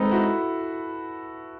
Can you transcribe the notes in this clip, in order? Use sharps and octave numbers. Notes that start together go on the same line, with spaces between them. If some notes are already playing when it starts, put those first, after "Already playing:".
Already playing: G#3 C4 D#4 A4 B4
E4 F#4